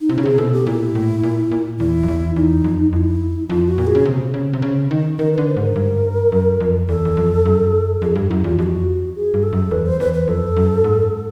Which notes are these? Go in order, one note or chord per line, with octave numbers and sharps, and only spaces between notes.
D#4
C3 E4
C#3
C3 G#4
B2 A4
G4
A#2 E4
A2
A#2
A#2
E2 E4
F2
E2
E2 D#4
F2
F2 E4
F2 F4
F#4
A#2
G#4
C#3
C3
C#3
C3
C#3
D#3
D#3 A#4
D3 B4
C5
G#2
A#4
G2
F#2
F2
E2 A4
E2
F2
F#2
F2 G#4
G2 G4
F#2 E4
E2 F4
F2 F#4 G4
G#4
G2
A4
F#2
E2 B4
C5
E2 B4
B4
F2 A4
F#2
G#2